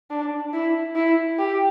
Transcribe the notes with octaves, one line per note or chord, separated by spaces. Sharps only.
D4
E4
E4
G4